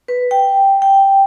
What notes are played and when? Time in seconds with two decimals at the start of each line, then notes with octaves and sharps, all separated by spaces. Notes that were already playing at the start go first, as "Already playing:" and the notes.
0.08 B4
0.31 G5
0.82 G5